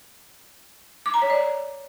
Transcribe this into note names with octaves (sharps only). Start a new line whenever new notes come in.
D6
A#5
C#5
D5